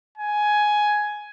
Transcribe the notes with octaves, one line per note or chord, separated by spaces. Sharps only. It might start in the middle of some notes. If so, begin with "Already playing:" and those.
G#5